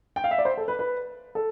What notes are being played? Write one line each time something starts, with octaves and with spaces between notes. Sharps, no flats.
G5
F5
E5
D5
C5
A4
B4
B4
A4